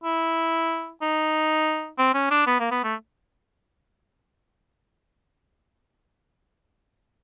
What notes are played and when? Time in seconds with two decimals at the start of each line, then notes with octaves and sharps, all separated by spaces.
0.04 E4
1.02 D#4
1.99 C4
2.14 C#4
2.31 D4
2.47 B3
2.60 A#3
2.71 B3
2.84 A3